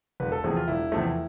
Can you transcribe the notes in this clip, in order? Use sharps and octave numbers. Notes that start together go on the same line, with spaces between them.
E1 B4
A4
E2 C3 F3 A3 G#4
F4
E1 E4
E2 C3 F3 A3